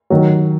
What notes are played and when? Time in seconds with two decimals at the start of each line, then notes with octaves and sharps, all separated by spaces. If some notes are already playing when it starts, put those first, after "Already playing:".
0.10 D#3 F#3